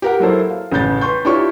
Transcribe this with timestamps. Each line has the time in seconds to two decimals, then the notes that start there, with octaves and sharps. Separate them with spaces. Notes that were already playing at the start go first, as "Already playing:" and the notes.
0.02 G4 A#4 F#5
0.20 F#3 A#3 E4 A4 C5
0.50 F5
0.72 A1 C#3 G6 A6
1.01 B4 C6 C#6 G6
1.25 D4 E4 F4 G4 C#5 C#6